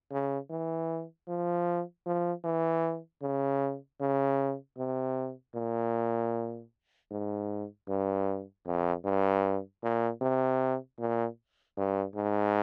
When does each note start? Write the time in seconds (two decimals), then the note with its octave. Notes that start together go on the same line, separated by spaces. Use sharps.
0.12 C#3
0.50 E3
1.28 F3
2.06 F3
2.44 E3
3.22 C#3
4.00 C#3
4.78 C3
5.55 A#2
7.11 G#2
7.88 G2
8.66 F2
9.05 G2
9.83 A#2
10.22 C3
10.99 A#2
11.77 G2
12.16 G#2